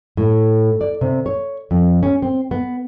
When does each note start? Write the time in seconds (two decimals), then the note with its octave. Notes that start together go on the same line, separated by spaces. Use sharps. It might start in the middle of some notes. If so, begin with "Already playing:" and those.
0.17 A2
0.81 D5
1.01 C3
1.26 C#5
1.71 F2
2.03 C#4
2.22 C4
2.51 B3